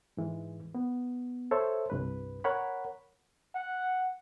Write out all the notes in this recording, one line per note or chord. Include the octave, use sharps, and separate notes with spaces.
G#2 E3 G#3
B3
A4 C5 C#5 E5
C2 G2 B4
A#4 C#5 F#5 B5
F#5